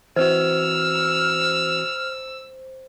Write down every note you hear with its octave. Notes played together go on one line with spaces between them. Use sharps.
E3 C4 F#4 C5 E6 F6